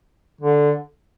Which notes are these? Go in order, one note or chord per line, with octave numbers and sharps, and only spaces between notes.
D3